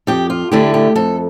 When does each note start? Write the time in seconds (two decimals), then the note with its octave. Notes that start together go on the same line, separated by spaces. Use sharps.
0.07 F2 G4
0.30 F4
0.52 D3 A3 E4 G4
0.74 G4
0.95 F2 A4